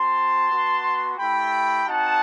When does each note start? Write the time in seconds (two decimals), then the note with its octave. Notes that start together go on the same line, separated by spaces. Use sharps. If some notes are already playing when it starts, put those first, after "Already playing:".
Already playing: C4 F#4 A5 C6
0.51 B3 F#4
1.18 A3 E4 G4 G5 B5
1.86 C4 D#4 F#4 F#5 A5